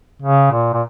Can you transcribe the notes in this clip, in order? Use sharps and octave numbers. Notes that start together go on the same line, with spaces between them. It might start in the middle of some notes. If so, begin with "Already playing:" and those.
C#3
A#2
A#2